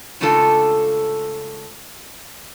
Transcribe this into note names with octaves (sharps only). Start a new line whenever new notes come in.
G#2 C#3 A3 D4 F4 A4